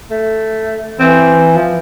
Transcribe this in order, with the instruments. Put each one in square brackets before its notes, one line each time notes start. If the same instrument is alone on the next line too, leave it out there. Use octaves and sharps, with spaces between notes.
[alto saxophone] A3
[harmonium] E3 [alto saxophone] C4
[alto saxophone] F3